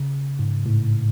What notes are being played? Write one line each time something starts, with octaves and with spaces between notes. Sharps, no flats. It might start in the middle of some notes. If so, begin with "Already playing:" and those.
Already playing: C#3
G#2
A2